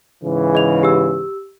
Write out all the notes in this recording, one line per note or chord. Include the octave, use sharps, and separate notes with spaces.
G#2 C#3 E3
G#4 D#5 F7
G4 E6